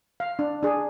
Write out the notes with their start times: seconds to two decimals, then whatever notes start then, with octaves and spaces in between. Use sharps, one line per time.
0.20 F5
0.39 D4
0.63 D4 G#4